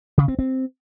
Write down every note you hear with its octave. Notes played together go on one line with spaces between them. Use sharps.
C#3
C4
C4